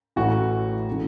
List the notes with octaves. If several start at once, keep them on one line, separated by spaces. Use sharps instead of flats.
A1 A2 E3 F#4
C#3 E3 A3